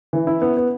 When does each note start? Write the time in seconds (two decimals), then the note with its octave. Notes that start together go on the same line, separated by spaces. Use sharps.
0.13 E3
0.27 E4
0.42 B3
0.57 B3